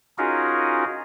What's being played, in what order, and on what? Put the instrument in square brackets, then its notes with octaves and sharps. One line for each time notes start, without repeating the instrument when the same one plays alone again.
[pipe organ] C#4 D#4 F4 F#4 G#4 A#4